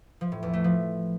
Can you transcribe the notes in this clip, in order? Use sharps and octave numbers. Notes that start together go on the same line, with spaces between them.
F3
A2
E2
A3
F3